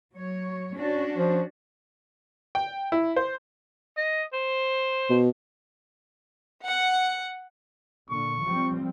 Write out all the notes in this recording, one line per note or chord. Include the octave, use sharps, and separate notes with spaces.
F#3 C#5
C#4 D4 F#4
F3
G5
E4
C5
D#5
C5
B2
F#5
A#2 D3 C#6
F3 G3 C4